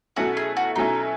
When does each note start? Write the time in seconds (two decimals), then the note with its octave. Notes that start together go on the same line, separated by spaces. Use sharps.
0.16 B2 F#3 A3 C#4 E4 F#4
0.37 G#4
0.57 F#4
0.76 B2 F#3 A3 C#4 D#4 E4